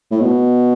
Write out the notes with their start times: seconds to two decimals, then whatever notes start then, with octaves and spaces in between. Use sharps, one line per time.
0.11 A2
0.21 B2